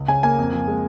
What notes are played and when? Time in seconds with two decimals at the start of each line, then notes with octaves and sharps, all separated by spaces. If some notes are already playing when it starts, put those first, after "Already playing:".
Already playing: C#2
0.08 C#3 G#5
0.23 A#3 G#5
0.38 F2
0.53 F3
0.68 G#3